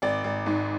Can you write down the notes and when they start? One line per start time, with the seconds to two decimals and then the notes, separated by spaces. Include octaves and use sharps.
0.02 G#1 D5
0.24 G#1
0.46 G#2